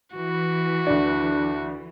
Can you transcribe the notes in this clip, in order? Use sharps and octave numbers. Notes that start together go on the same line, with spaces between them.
E3 F#4
D2 D4 D5